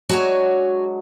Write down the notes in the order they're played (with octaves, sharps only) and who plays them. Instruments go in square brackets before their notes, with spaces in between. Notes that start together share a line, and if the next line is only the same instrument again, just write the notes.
[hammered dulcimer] F#3 G#3 D4 [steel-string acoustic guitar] F#4 C#5 G#5